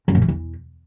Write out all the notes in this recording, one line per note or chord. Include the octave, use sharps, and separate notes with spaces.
F#2
A#2
E3
E2